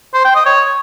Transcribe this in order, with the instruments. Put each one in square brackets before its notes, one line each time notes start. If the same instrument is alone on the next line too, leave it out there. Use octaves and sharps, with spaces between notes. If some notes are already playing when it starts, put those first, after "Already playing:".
[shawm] C5
G5
D#5
C#5